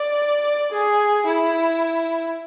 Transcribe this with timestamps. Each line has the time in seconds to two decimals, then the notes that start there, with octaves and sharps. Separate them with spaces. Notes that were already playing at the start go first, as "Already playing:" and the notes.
Already playing: D5
0.72 G#4
1.27 E4